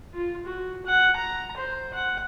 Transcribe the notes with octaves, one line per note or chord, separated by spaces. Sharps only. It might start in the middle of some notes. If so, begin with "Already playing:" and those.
F4
F#4
F#5
A#5
C5
F#5